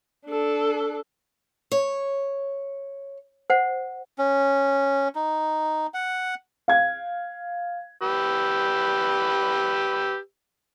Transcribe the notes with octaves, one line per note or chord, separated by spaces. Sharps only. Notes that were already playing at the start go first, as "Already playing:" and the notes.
D4 A4
C#5
C5 F#5
C#4
D#4
F#5
F5 G#6
G4 B4 E6